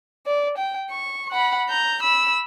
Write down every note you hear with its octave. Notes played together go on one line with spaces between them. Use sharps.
D5
G5
C#6
F#5 B5
A#5 G6
B5 E6